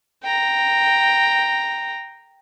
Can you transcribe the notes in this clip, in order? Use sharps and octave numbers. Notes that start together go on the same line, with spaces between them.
G5 A#5